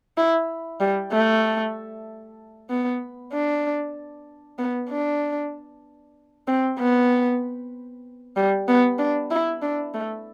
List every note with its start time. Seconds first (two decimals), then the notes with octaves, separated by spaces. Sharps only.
0.17 E4
0.80 G3
1.13 A3
2.70 B3
3.33 D4
4.59 B3
4.89 D4
6.47 C4
6.79 B3
8.36 G3
8.68 B3
8.99 D4
9.31 E4
9.62 D4
9.94 A3